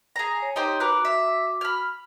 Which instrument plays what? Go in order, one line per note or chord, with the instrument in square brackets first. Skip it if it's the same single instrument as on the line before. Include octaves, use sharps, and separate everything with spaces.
[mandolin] G#4 A#5
[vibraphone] C#5
[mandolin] D#4 G4 C5
[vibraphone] F#4 D6 [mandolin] A#4 B4
[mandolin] E5
B5 F6